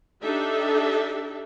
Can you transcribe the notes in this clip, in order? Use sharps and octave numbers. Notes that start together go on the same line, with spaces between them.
D4 D#4 G4 A4 E5